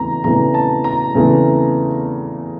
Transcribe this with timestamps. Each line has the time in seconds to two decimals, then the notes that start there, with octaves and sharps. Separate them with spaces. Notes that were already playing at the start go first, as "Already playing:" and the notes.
Already playing: E2 C#3 E3 A3 C4 A#5
0.24 E2 C#3 E3 A3 C4 A#5
0.54 A5
0.84 A#5
1.14 E2 C#3 E3 A3 C4